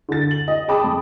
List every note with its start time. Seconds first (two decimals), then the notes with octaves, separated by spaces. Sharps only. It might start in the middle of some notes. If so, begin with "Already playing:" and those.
0.09 D3 A6
0.31 F#7
0.48 D#5
0.68 G#4 G5 A5 B5 D6 D#6
0.84 F2